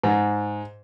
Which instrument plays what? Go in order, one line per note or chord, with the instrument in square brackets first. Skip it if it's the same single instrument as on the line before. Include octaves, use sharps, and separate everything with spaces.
[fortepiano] G#2